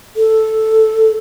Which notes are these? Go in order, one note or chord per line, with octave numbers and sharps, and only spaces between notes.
A4